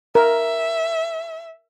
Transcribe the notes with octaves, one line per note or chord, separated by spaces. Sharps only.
A#4 E5